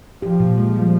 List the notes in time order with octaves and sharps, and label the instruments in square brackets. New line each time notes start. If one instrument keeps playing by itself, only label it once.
[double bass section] F3 [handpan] G4
[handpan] A#2
G#3
G3